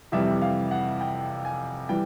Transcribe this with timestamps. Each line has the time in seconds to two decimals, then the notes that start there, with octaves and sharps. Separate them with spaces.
0.12 F2 C3 E3 G3 E5
0.42 F5
0.71 F#5
1.01 G5
1.45 G#5
1.89 E3 G3 G5